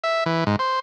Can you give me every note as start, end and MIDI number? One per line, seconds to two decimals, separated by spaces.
0.04 0.24 76
0.26 0.44 52
0.47 0.56 44
0.59 0.80 72